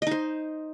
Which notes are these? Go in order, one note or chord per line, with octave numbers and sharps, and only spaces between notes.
D#4 C5 D#5